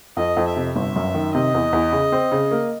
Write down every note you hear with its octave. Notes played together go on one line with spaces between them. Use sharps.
F2 D#5
F2
E5
C3
G1 E5
F#2
D#3
C3 D#5
E2
E2
C#3
C4
C#3
A#3